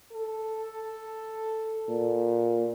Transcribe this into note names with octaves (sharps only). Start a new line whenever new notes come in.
A4
A#2